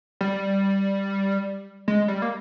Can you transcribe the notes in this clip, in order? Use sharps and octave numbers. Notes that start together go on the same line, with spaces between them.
G3
G#3
G3
A#3